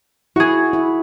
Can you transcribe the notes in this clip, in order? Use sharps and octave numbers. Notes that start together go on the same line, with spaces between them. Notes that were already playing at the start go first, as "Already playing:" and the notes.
E4 F#4 G#4
E4